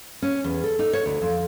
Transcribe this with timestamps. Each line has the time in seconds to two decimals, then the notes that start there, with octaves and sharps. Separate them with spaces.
0.22 C#4
0.44 E2
0.64 A4
0.79 D#4
0.93 C#5
1.06 D2
1.22 F2